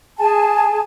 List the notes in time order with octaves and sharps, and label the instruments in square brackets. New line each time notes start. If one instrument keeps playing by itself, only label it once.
[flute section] G#4 G#5 A5